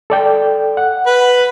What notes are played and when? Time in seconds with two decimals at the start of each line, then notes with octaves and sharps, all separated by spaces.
0.10 A4 D5 G5
0.77 F#5
1.06 B4